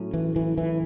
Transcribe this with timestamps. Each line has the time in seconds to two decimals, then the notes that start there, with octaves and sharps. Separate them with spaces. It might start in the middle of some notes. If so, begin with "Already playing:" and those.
Already playing: A2 F#3 A3 C#4
0.14 E3
0.36 E3
0.58 E3